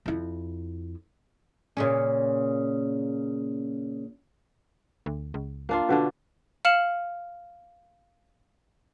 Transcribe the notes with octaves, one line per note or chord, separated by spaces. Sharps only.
F2 E4
A#2 C#3 C#4
D2
C#2
A#3 D4 F4
B2 D3 D4
F5 F6 C#7 E7 F#7